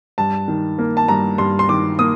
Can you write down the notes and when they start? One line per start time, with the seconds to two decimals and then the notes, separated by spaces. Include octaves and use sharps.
0.18 G2 A5
0.48 D#3
0.79 A#3
0.97 A5
1.08 G2 A#5
1.38 G2 C6
1.59 C6
1.69 D#3 D6
1.99 A#3 D#6